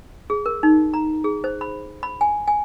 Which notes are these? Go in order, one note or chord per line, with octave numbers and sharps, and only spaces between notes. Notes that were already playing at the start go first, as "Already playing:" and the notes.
G#4
A#4
D#4
A#5
G#4
C5
B5
B5
G#5
G#5